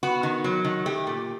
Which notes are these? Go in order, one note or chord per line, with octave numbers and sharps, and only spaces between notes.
B3 F#4
D#3
F#3
D#3
A3 G4
A#2